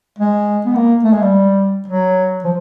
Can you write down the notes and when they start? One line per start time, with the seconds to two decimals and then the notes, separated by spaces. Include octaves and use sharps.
0.18 G#3
0.66 B3
0.75 A#3
1.04 A3
1.13 G#3
1.22 G3
1.88 F#3
2.44 F3